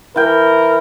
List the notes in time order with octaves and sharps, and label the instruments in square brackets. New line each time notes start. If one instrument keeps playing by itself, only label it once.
[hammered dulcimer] E3 G5 [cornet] A#4